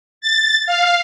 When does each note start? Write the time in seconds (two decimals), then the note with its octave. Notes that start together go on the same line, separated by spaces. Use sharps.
0.21 A6
0.66 F5